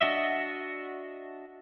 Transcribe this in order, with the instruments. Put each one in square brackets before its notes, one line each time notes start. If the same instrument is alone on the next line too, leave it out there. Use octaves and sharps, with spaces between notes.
[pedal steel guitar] D4 F#4 D#5 E5